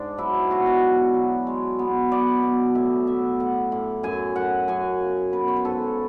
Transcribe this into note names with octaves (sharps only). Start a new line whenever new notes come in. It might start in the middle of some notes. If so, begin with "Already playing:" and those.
Already playing: G#2 D4
F#3 E4
E4
B2 F#4
F#4
B2
F#3
G#3
B3
B3 D5
B2
A2 E5
B3 E5
A2 F#5
A2
F#2 G#5
F#2 F#5
F#2 G#5
C#3
B3 B4
C#5
B4
G#2 A4